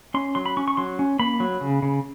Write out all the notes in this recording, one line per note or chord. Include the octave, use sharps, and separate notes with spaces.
C#4 C6
F#3 C6
B5
C#4 C#6
C#6
F#3 C6
C#4
A#3 B5
F#3
C#3
C#3